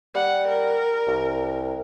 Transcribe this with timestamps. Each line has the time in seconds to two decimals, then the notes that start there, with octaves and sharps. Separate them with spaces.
0.15 G3 F#5
0.48 A#4
1.08 C2